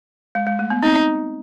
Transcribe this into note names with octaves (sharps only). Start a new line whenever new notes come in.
G#3
G#3
A3
B3
C4 D#4